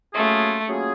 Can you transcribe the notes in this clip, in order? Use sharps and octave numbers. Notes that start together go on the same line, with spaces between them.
F#3 A3 A#3 C#4 F4 G#4
F#3 A#3 C#4 F4 G#4